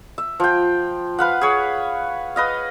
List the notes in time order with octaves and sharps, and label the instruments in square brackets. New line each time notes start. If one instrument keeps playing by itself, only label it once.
[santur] E5
F3 G5
B4 F5 F#5
G#4 C#5
B4 D#5 F5